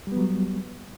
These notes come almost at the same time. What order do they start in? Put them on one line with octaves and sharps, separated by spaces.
G3 B3 F#3